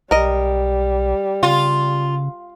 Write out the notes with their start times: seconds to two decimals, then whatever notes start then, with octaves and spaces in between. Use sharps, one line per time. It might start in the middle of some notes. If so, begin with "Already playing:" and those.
0.11 B1 G3 A#4 D#5
1.43 C#3 F4